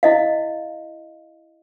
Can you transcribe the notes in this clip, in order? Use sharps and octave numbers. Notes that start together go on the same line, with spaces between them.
E4 D#5 F5